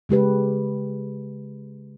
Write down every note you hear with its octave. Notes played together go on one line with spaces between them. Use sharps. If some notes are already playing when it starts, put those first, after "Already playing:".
C#3 G#3 G4 B4